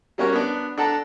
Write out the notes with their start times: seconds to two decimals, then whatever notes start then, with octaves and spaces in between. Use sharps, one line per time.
0.18 G3 A#3 C#4 F#4 A#4 C#5
0.33 B3 D4
0.78 D4 A4 F#5 A5 A#5